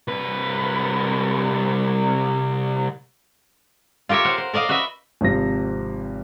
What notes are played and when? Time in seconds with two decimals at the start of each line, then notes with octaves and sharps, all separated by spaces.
0.08 C2 B4
4.09 F4 G4 A#4 C#5 E5
4.25 C5 F5 F#5
4.38 C5
4.54 A#4 D5 D#5 F5
4.69 F#4 B4 D#5 E5
5.21 G#1 C3 F3 A#6